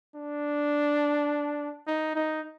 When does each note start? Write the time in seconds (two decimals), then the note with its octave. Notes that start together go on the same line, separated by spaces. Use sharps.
0.16 D4
1.87 D#4
2.15 D#4